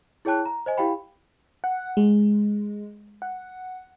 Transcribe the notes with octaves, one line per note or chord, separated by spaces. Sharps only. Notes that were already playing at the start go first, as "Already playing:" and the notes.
E4 G#4 C#5 G5 A5 F#6
A#5
C5 D#5 G#5
E4 G4 F5 G5 B5
F#5
G#3
F#5